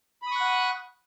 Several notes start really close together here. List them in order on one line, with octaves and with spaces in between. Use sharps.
B5 D#6 C#6 F#6 F#5